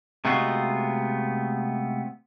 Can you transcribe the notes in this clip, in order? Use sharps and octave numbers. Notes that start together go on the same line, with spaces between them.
C3 G#3 A3 B3 F4 F#4